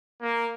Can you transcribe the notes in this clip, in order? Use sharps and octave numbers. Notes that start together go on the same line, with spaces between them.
A#3